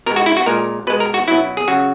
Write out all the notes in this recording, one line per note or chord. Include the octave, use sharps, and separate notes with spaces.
B2 G#3 A#4
F#4
E4
F#4
A#2 G#3 A#4
B2 G#3 B4
A#4
F#4
B2 F#3 E4
G#4
C#3 F#3 F#4